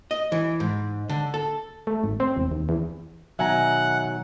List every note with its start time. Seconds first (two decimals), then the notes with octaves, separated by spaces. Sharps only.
0.11 D#5
0.32 E3
0.60 G#2
1.09 D3
1.34 A4
1.87 A3
2.04 G#1
2.20 C4
2.37 E1
2.52 D#2
2.69 E2
3.39 B2 D#3 F#3 E5 F#5 G#5 A#5